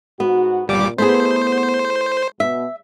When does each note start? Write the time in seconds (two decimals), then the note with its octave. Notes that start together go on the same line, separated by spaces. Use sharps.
0.20 G#2 B3 F#4
0.68 G1 A#2 G3 D6
0.98 A3 B3 E4 G#4 C5
2.40 B2 E5